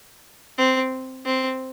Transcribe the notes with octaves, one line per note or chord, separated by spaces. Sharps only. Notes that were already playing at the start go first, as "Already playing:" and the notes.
C4
C4